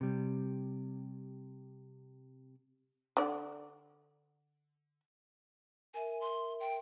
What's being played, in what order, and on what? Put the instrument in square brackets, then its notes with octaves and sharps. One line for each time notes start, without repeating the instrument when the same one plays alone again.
[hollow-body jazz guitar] C3 G3
[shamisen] D3 D5
[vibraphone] A#4 E5 [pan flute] G#5
[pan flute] C6
G5